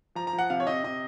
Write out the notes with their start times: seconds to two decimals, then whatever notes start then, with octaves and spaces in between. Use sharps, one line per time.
0.15 F3 A#5
0.27 A#5
0.33 F3
0.39 F#5
0.50 C3 F5
0.60 C#5
0.67 C3 D#5
0.84 C3 D#5